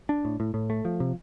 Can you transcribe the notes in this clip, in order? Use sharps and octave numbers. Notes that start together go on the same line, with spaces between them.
D4
A2
A2
A2
A3
F3
C3